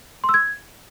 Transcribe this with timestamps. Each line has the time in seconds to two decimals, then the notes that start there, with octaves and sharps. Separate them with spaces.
0.24 C6
0.29 E6
0.34 G#6